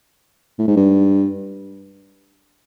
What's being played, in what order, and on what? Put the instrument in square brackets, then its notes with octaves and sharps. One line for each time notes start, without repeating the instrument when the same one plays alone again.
[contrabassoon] A2
G#2
G2